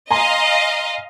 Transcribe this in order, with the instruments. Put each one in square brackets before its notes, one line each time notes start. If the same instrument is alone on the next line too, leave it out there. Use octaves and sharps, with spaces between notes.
[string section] D#5 F5 [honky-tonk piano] G#5 A#5 C6